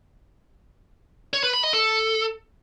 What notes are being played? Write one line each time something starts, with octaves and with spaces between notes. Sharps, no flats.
C#5
B4
B5
D#5
A4